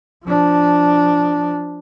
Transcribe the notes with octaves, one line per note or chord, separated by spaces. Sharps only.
F3 D4